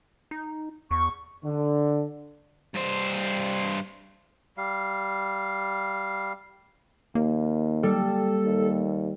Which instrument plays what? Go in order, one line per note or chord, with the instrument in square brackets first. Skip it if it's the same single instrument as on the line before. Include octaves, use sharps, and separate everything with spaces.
[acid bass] D#4
[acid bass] E2 [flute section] C#6
[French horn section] D3
[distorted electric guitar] G2 C5
[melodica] G3 F5
[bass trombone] D#2 [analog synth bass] A#3
[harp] G3 [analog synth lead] A4
[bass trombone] D#2